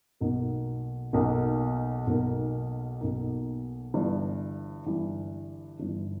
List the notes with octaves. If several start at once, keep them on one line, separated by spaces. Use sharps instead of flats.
B1 B2 A#3 D#4 A#4
B1 B2 A#3 D#4 A#4
B1 B2 A#3 D#4 A#4
B1 B2 A#3 D#4 A#4
G1 G2 E3
G1 G2 E3
G1 G2 E3